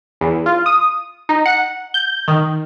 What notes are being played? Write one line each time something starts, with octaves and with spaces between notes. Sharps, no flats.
E2
F4
D#6
D#4
F#5
G6
D#3